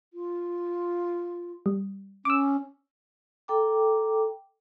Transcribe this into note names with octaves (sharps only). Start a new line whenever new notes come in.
F4
G3
C#4 D6 E6
A4 G5 A#5 D6